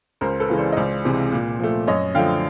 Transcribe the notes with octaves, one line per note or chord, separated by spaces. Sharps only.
C#2 A#4 C5
A4 B4
C#3 E3 G#3
C5 D5
D#5
C#2 C5 D5
C3 E3 G#3
A#2
F3 A3
F#2 C#5 D#5
D3 F3 A3 F5 G5